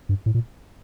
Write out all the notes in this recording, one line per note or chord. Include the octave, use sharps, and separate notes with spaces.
G2
A2
A#2